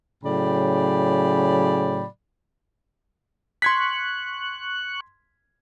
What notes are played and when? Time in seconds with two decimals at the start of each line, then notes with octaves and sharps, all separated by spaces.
0.24 A2 C#3 F#3 D5 G5 B5
3.62 C6 C#6 F#6 G#6 B6